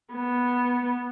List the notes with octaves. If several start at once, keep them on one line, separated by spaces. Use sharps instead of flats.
B3